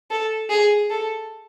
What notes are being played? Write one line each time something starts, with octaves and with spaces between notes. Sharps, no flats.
A4
G#4
A4